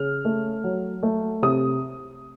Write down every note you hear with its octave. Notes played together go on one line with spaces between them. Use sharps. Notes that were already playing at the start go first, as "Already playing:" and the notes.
Already playing: C#3 F6
A3
F#3
A3
C3 D#6